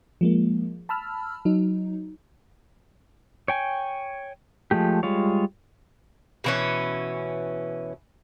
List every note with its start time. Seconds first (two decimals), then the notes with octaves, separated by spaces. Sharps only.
0.21 F3 G#3 A#3
0.89 A5 B5 E6 F6
1.45 F#3 D#4
3.48 C#5 G5 G#5
4.71 F3 G#3 A3 G4
5.03 G3 G#3 F4 C#5
6.44 B2 E3 C#4